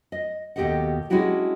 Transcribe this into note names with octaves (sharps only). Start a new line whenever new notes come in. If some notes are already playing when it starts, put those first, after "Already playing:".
D#5
D#2 B2 G4 A4 D#5 F#5
G#3 C#4 D4 E4 F#4 G4